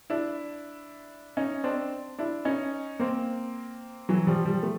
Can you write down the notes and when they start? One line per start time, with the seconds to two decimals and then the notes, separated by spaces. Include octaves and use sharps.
0.10 D4 E4
1.37 C#4 D#4
1.64 C4 D4
2.19 D4 E4
2.45 C#4 D#4
2.99 A#3 C4
4.09 E3 F#3
4.27 F3 G3
4.45 F3 G3
4.63 A3